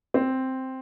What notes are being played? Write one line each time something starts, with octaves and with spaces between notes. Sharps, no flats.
C4